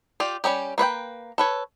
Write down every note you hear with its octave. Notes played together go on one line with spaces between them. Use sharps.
F4 G4 D5
G3 C#4 D#4 G4
A#3 B4 C#5 G5
A4 B4 C#5